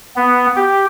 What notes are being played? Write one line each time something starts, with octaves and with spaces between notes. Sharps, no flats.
B3
G4